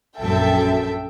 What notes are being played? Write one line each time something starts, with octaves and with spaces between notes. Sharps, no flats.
A#1 F#2 A4 E5 G5